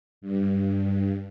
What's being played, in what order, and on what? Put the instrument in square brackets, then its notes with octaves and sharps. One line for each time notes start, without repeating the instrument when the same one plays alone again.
[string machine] G2